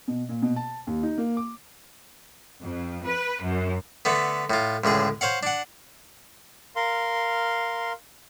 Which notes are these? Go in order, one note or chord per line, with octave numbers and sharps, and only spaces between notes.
B2
A#2
B2
A5
D#2
D#4
A#3
D6
F2
B4
F#2
D3 A3 B3
A2 F4
C#2 A2 D3 G#4
C5 C#5 F5 F#5
D4 F#5
A#4 F5 C6